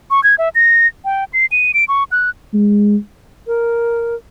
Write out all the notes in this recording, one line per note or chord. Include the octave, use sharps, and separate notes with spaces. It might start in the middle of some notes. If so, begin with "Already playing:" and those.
C#6
G#6
E5
A#6
G5
C7
D#7
D7
C#6
F#6
G#3
A#4